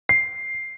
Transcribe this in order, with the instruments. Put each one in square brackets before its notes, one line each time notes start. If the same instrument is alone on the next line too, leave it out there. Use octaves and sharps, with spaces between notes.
[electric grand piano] C7